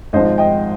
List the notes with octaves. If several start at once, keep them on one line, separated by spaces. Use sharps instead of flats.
G#1 G#2 F3 C5 D#5
D#5 G5